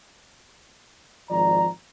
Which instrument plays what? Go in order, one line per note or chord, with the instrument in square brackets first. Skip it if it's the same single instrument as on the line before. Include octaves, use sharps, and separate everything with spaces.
[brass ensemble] G#1 F3 D5 A#5